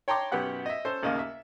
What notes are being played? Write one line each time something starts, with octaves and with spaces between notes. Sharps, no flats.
C#5 G5 A5 A#5 C6 D6
B1 F#2 B3 G4 F#5 F#6
D#5 E5
C#4 A4 C5
A1 D#2 C#3 A#3 D#5
E5